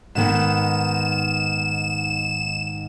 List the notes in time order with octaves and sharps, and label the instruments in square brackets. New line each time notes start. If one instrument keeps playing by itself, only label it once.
[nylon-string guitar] G#2 D#3 B3 [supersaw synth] E7